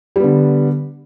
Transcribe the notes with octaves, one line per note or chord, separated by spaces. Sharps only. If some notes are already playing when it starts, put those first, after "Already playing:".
D3 G3 B3